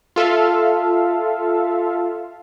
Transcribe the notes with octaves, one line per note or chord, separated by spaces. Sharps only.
F4 A4 E5 F5